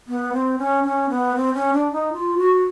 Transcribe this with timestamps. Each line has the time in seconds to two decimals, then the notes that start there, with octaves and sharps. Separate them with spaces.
0.08 B3
0.33 C4
0.59 C#4
0.84 C#4
1.10 B3
1.36 C4
1.54 C#4
1.73 D4
1.92 D#4
2.13 F4
2.38 F#4